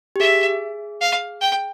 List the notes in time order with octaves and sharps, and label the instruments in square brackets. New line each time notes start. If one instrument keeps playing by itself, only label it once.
[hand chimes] G4
[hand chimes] G#4 [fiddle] E5
[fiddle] F5
G5